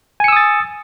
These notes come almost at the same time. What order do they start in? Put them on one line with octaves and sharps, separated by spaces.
G#5 C#7 E6 D#6 A6